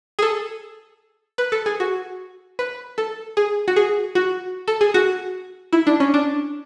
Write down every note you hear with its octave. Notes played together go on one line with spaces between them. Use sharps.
G#4
A4
B4
A4
G#4
F#4
B4
A4
G#4
F#4
G#4
F#4
A4
G#4
F#4
E4
D4
C#4
D4